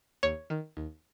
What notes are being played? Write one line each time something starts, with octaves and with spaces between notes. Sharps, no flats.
D#2 C#5
D#3
D#2